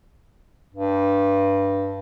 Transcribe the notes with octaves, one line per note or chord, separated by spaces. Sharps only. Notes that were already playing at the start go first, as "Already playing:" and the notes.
G2